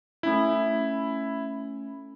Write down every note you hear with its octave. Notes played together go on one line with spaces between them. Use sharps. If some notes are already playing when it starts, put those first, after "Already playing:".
A3 C#4 E4 B5